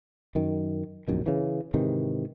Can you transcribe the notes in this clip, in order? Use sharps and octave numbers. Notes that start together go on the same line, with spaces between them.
F#2 D#3
E1 A#1 F#2 D#3
C#3 E3
G#2 C3 D#3 E3